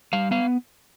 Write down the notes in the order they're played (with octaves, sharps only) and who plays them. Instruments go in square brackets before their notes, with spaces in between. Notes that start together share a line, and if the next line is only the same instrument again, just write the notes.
[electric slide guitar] G3 F5
B3 F5